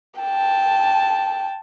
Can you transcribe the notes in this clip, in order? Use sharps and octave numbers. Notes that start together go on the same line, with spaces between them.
G5 A5